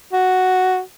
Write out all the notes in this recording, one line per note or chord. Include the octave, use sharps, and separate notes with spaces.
F#4